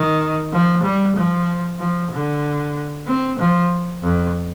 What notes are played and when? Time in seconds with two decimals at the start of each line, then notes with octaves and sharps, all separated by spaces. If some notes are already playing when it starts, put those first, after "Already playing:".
Already playing: D#3
0.52 F3
0.83 G3
1.16 F3
1.79 F3
2.11 D3
3.07 C4
3.39 F3
4.03 F2